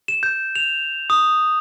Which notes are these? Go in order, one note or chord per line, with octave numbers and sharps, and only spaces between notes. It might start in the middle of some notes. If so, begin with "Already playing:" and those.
E7
G6
F7
D#6